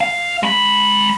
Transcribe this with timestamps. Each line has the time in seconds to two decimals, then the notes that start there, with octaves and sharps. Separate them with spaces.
0.01 F5
0.43 G#3 B5